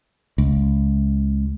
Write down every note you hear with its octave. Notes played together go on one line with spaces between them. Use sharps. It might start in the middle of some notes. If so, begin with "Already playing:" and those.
C#2